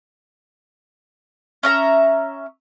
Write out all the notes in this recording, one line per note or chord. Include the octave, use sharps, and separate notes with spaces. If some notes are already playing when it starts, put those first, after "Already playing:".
C#4 E5 A#5